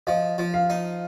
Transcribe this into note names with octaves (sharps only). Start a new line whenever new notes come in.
F3 D#5
F3
F5
D#4